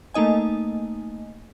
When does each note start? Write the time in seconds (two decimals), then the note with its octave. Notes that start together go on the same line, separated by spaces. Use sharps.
0.14 A3 A#3 D#4 D#5 G#5